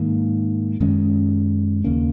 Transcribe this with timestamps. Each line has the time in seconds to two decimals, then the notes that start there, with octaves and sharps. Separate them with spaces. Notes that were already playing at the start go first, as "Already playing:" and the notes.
Already playing: G#2 D#3 A#3
0.80 F#2 D#3 G#3 C#4
1.84 D#2 C#3 A#3 C#4